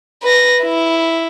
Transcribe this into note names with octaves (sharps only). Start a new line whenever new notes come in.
B4 A#6
E4